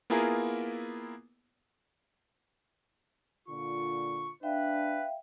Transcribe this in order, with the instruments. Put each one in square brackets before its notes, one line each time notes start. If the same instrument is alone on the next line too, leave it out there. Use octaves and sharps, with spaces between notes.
[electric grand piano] A#3 B3 E4 F4 G#4 A#4
[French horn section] A#2 D3 F4 [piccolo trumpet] C#6
[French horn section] D4 [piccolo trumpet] B4 [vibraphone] E5 F5 G5